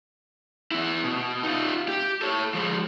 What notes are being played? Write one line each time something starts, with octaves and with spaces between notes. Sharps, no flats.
B3 E4
B2
D#4 F4
G4
A4 C#5
F3 G#3